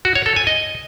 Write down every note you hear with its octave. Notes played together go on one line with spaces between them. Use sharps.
F#4
C#5
A4
G#5
D#5